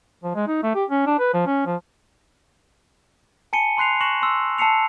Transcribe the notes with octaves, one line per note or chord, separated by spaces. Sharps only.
F3
G#3
D#4
A3
G4
C#4
D4
B4
F3
C#4
F3
G#5 A5 B5 C#7 D#7 G7
B5 C6 F#6 C7 F7
C#6 F#6 A#6 C#7 E7 F#7
C6 E6
A5 E6 C7 C#7 F7